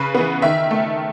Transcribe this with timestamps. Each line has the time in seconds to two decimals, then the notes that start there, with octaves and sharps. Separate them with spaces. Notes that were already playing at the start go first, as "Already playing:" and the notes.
Already playing: C#3 B4
0.15 E3 B3
0.42 D#3 E5
0.71 A3